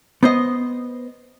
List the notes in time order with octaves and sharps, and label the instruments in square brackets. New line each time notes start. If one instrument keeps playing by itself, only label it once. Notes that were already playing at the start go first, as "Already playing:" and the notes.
[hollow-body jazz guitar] B3 C5 D#5